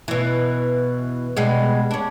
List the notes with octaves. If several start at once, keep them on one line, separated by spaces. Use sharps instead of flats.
B2 E3
B2 G3 G#3
C#4 D4